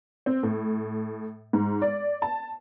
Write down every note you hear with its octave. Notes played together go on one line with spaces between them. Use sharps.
C4
A2
G#2
D5
A5